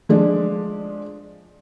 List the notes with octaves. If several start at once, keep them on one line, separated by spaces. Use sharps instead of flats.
F3 G#3 D4